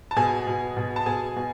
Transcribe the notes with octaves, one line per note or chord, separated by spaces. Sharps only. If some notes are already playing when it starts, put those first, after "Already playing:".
A5
B2 G#4 G#5
B2
B2
A5
B2 G#4 G#5
B2